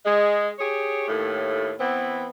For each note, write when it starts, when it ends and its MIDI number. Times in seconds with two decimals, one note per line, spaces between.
0.06 0.53 56
0.60 1.07 67
0.60 1.07 68
0.60 1.07 73
1.08 1.74 39
1.08 1.74 45
1.80 2.28 52
1.80 2.28 59
1.80 2.28 60